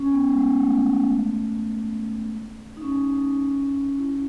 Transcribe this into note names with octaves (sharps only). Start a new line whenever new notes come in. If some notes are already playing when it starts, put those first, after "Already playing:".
Already playing: C#4
B3
G#3
A3
D#4
C#4
E4